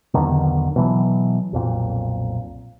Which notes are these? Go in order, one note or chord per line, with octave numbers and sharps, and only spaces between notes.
B1 E2 D3 D#3
B2 E3 F#3
B1 F2 A#2